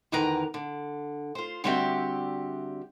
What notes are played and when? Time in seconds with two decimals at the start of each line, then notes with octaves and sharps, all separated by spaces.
0.12 E2 D3 D#3 A#4 B4 A#5
0.54 D3
1.35 F4 C5
1.64 D3 G3 C4 F#4 G4 E5